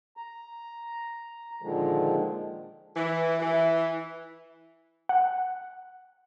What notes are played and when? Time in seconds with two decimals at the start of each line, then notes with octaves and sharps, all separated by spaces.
0.17 A#5
1.62 A#2 D3 D#3 F3 G#3
2.96 E3
3.40 E3
5.09 F#5